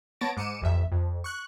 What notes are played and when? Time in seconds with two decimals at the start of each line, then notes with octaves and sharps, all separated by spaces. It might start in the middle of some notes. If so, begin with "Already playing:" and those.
0.21 B3 C#5 A5 A6 A#6 D7
0.37 G#2 D6 C#7 D#7 E7
0.62 A1 F2 E5
0.91 F2
1.24 C#6 F#6